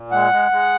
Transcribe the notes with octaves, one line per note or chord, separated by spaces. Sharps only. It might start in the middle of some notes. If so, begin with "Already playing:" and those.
Already playing: A#2
G#3 F#5
G#3
G#3